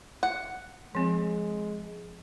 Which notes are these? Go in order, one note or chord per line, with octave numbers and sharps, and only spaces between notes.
F#5
F3 G#3 C4